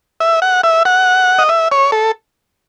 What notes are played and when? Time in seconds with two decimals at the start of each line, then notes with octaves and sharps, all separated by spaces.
0.20 E5
0.42 F#5
0.63 E5
0.85 F#5
1.39 D#5
1.49 E5
1.72 C#5
1.92 A4